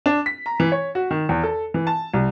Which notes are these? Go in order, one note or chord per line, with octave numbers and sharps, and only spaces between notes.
D4
B6
A#5
E3
C#5
F#4
D#3
E2
A4
E3
A5
C2